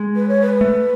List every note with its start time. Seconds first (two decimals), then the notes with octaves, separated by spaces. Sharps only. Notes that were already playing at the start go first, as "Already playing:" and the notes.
Already playing: G#3
0.16 B4
0.28 C#5
0.42 B4
0.61 A3